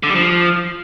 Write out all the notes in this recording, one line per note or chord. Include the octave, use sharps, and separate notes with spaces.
D3
G3
F3